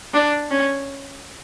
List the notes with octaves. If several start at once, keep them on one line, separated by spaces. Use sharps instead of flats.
D4
C#4